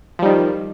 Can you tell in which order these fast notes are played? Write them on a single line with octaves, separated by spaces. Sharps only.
F3 G3 D#3